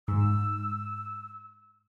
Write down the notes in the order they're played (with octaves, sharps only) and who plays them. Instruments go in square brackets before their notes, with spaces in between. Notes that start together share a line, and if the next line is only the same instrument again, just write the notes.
[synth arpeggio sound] G#2 [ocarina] E6